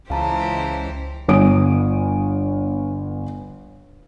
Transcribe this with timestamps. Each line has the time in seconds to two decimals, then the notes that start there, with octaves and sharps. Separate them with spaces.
0.10 C#2 E3 G4 C5 F5 A5 A#5
1.28 G1 B3 C#5 G#5 D#6 D7